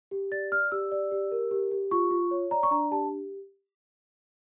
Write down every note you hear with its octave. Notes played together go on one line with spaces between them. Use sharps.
G4
D5 A6
D5 F6
G4 E6
D5
G4
A#4
G4
G4
F4 C#6
F4
C#5
D5 A#5
C#6
D4 A#5
G4 A5